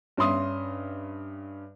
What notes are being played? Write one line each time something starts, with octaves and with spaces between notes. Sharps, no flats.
G2 C#4 E5 C6 D#6